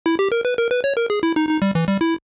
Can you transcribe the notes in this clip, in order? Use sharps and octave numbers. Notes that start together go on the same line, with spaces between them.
E4
G4
A#4
B4
A#4
B4
C#5
A#4
G#4
E4
D#4
D#4
G3
E3
G3
E4